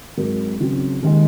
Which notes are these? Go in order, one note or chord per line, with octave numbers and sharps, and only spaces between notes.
G#2 F#3 C4 F#4 A#4
C#3 F#3 C4
D#2 D#3 G#3